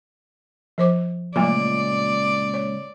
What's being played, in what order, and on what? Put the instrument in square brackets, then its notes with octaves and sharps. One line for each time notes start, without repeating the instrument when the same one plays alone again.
[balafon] F3 C5 D6
[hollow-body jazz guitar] C#2 A#2 [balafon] F#3 A3 [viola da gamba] D5
[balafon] C#5